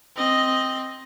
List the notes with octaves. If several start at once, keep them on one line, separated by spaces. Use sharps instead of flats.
C4 D#5